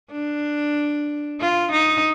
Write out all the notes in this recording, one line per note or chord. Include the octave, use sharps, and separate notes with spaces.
D4
F4
D#4